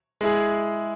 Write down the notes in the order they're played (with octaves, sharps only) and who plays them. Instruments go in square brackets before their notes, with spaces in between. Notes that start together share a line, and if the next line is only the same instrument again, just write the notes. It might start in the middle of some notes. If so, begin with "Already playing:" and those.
[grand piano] G#3 E4 G#4